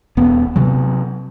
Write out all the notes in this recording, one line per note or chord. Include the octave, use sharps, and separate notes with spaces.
D#1 B3
C3 F#3